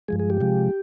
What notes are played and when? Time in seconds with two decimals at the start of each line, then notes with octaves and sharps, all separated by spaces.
0.08 G2 F3 G#3 G#4
0.20 G#4
0.30 G4
0.41 C3 F3 G#3